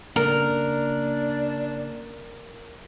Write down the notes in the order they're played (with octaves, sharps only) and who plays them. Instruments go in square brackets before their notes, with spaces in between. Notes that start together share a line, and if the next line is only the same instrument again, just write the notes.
[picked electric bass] C#3 A#3 [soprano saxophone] D4 [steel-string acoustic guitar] A#4